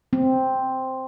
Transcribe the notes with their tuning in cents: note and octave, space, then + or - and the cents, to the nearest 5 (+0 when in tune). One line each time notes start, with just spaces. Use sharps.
C4 +0